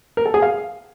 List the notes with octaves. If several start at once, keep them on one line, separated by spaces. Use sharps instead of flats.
A#4
A4
G#4
F5